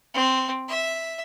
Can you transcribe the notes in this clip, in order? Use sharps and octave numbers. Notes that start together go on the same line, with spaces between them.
C4
E5